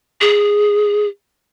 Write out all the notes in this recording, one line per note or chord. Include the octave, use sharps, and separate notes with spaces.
G#4